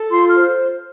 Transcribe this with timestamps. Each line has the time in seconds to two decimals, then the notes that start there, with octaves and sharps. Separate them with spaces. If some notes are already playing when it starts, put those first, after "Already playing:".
Already playing: A4
0.11 F4 C6
0.30 F6
0.36 C5